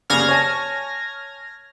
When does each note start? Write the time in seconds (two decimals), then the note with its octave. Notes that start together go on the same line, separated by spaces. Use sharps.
0.10 D#2 C#3 D5 F6 G#6 A#6
0.29 C#5 G#5 A5